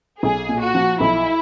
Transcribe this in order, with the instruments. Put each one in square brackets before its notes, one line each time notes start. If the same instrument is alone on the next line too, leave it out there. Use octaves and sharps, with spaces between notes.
[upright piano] B1 [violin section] G#4
[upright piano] A#2
[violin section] F#4
[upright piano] F3
[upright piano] B1 [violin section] E4